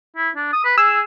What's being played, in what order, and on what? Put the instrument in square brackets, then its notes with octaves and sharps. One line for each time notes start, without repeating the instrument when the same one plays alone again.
[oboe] E4
D4
D#6
B4
[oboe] G#4 [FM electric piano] E6